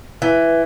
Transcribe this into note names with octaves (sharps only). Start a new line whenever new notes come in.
E3